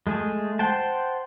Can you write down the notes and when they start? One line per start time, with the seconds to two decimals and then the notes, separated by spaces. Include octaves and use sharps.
0.07 G#3 A3 G#4
0.59 C5 F#5 G5 A5